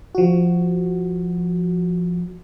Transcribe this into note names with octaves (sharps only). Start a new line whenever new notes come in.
F3 F#4